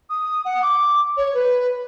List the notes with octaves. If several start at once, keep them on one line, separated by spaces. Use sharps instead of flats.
D#6
F#5
D6
C#5
B4